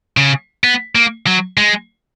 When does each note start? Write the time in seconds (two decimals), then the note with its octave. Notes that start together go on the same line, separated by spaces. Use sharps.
0.17 C#3
0.64 B3
0.95 A#3
1.27 F#3
1.57 G#3